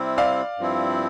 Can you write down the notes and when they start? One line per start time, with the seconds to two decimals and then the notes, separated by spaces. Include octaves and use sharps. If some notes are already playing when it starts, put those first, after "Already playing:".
Already playing: C3 G3 C4 E4
0.18 D5 F5
0.58 G2 F3 C4 E4